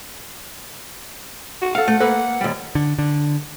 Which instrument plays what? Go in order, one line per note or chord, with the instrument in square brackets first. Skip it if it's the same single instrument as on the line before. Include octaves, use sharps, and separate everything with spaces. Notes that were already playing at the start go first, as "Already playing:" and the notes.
[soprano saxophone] F#4
[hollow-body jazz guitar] A4 F5 [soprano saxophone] F#5
[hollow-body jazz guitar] A3
A#3 A4 B4
D#2 G3
[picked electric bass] D3
D3